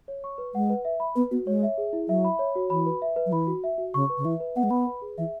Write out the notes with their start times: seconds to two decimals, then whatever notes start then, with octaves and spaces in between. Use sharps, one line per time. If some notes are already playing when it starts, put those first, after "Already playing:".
0.08 C#5
0.24 C#6
0.38 B4
0.55 G#3 F#5
0.70 B4
0.85 E5
1.00 B5
1.15 B3 B4
1.31 B3 F#4
1.47 G#3 C#5
1.63 E5
1.78 G#4
1.93 E4
2.08 F#3 E5
2.24 B5
2.39 C#5
2.56 F#4
2.70 E3 B5
2.86 B4
3.02 E5
3.16 B4
3.26 F#3
3.32 E3 B5
3.47 F#4
3.64 E5
3.78 F#4
3.94 C#3 C#6
4.10 B4
4.17 C#3
4.25 E3 E5
4.40 B4
4.56 B3 F#5
4.63 G#3
4.70 B3 B5
4.87 B4
5.02 G#4
5.18 E3 E5